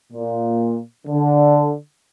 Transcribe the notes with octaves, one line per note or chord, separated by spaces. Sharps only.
A#2
D3